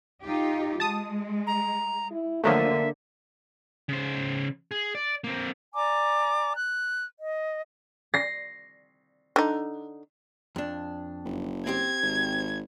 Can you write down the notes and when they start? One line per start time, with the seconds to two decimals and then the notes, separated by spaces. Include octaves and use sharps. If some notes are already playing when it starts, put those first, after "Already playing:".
0.24 D#4 F4 G4
0.80 G#3 A5 D#6
1.47 A#5
2.11 E4
2.44 D3 F3 F#3 A3 A#3 E5
3.89 C#3 C5
4.71 G#4
4.95 D5
5.24 A#3 C4
5.74 D5 G#5 A#5 D6
6.56 F#6
7.19 D#5
8.14 A#6 C7
9.36 D3 D#4
10.56 F2 D4
11.25 F#1
11.67 C4 G4 G#6
12.03 G#1